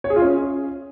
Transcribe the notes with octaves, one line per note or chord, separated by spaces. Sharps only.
C#5
G#4
F4
C#4